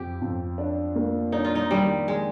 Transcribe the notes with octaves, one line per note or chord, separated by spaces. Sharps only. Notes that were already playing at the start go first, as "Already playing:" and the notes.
Already playing: F2 G4
F2
D4
A#3
D4 D#4
F4
D#4
D#3 G3
G#3